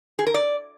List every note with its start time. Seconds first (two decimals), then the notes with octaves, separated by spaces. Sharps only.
0.19 G#4
0.27 A#4
0.34 D5